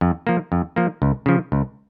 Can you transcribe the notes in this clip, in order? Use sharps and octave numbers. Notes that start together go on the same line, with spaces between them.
F2
F3 A#3
F2
F3 A#3
C#2
C#3 F3
C#2